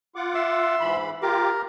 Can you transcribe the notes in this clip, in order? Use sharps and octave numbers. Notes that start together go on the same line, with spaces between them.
F4 F#5 D6
E5 C6 E6
G#2 E3 B5
F4 G4 A#4 D6